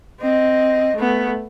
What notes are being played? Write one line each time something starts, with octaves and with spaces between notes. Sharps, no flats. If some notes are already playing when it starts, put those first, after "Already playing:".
C4 D#5
A3 B3